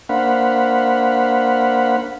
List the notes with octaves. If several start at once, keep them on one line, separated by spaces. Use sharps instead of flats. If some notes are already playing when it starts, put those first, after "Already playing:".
A#3 D4 C5 F5 F#5 B5